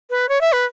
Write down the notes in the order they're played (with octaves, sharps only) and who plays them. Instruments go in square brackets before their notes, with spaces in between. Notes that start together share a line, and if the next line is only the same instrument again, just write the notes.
[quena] B4
C#5
E5
B4